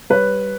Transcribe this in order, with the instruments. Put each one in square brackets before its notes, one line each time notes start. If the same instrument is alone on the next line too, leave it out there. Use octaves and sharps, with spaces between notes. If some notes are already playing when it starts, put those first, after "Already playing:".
[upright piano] G3 B4 C#5